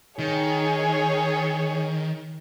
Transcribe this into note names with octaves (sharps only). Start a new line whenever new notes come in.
D#3 G#4 C#5